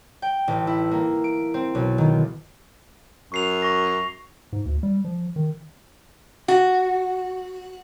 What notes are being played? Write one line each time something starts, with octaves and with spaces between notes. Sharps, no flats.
G5
A1
E4
A#3
D7
C4
B1
D#3
F#2 C#6 C7 F7
C#6 A#6
G#2
D2
G3
F3
D#3
F#4